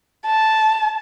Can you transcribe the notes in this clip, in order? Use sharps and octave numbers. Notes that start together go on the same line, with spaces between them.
A5